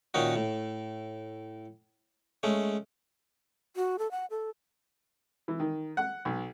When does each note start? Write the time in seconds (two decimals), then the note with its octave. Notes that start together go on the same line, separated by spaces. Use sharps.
0.14 A#2 D#3 C#4 D#4 F#4
0.36 A2
2.43 G#3 A3 C#4
3.76 F#4
3.99 A4
4.11 F#5
4.30 A4
5.48 E3
5.60 D#3
5.97 F#5
6.25 B1